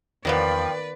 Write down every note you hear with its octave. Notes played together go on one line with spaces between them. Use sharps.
E2 G2 D#3 F3 A#3 B3 B4 D5